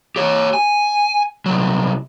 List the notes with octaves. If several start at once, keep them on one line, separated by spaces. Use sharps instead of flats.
G4 C#5
G#5
C2 F#3